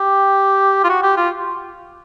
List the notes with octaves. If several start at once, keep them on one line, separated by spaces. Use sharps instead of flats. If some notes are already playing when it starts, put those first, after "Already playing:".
Already playing: G4
F4
F#4
G4
F4